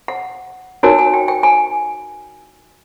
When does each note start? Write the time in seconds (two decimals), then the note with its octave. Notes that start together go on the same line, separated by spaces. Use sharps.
0.08 F#5
0.83 D#4 F#4 A#4 C#5 G#5
0.98 G#5
1.14 G5
1.28 G5
1.43 G#5